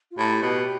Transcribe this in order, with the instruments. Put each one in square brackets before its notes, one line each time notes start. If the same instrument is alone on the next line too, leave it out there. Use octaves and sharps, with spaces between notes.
[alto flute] F4
[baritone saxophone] A2 [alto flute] G4
[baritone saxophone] B2